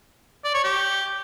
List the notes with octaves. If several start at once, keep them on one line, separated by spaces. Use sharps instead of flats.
D5
C#5
G4